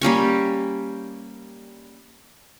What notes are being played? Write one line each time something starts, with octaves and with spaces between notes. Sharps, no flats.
G3 A#3 C#4 C#6